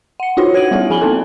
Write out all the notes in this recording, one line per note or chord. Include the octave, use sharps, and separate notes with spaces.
F#5 C#7
D4 D#4 F4 F#4 C#5
C#5 F#5 G#6 D7 D#7 F#7
G3 B3 E4 F#4 G#4
F3 G#4 G#5 B5 F#7 G7
A#3 C4 D#4 A4